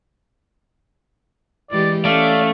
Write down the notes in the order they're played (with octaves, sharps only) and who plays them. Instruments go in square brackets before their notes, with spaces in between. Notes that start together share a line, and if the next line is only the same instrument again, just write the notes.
[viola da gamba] E3 G#3 G4 [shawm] D5
[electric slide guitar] A3 [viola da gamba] C#4 [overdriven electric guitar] D5 [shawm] F5